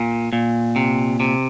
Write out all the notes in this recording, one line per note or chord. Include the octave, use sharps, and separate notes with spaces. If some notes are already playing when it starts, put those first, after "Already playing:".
Already playing: A#2
A#2
C3
C3